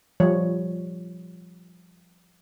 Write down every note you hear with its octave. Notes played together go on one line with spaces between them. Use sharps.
F3 G3 C#5